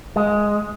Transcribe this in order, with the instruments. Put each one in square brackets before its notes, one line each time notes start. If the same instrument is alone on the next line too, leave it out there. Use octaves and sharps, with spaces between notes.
[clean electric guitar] G#3